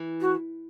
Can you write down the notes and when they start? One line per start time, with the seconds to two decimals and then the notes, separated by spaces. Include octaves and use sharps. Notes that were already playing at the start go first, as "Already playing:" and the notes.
Already playing: E3
0.20 F#4